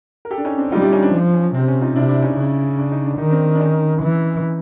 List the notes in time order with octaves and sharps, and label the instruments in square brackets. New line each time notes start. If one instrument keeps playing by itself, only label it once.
[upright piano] A#4
G4 A4
D4
C#4 D#4
C4 D4
[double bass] G3 [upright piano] D#4 F4
[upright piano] D4 E4
C#4 D#4
C4 D4
[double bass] F3
[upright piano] C#4
[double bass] C3 [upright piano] C4
[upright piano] C#4
D#4 F4
[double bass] C3 [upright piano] D4 E4
[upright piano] D4 E4
C#4 D#4
[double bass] C#3
[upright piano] D4
D#4
D4
[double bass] D#3 [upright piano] D#4
[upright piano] C4 D4
D4
C#4 D#4
[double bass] E3